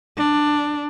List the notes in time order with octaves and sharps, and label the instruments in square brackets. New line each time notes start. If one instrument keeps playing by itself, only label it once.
[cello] D4